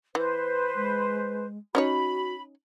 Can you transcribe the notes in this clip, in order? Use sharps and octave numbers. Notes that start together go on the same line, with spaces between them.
E3 B4 C5
G#3
C#4 D#4 F#4 C#5 B5